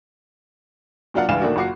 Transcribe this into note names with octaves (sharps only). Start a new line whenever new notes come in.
A#2 F#3 D4 F4 F5 F#5
C#2 G2 E3 G3 F5 E7
A#2 D#3 A3 D4 F#4
F#1 F4 F#4 D6 C7